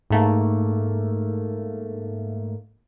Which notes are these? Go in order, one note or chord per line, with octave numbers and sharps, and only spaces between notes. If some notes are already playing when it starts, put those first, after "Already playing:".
G#2 A3 A#3